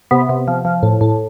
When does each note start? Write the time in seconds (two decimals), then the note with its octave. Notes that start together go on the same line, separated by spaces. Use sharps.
0.11 C3 B3
0.29 C3
0.48 F3
0.65 F3
0.83 A2
1.01 A2